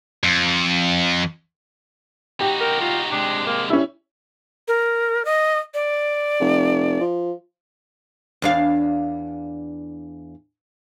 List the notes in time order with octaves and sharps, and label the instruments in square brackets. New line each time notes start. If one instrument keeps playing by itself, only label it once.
[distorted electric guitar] F2
[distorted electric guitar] D#4 F#4 [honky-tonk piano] G4
[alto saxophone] A#4
F4
[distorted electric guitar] C3 G#3 [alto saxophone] D4
[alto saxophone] A#3
[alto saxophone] G3 [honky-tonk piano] C#4 E4
[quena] A#4
D#5
D5
[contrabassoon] F1
F3
[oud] E2 D4 F5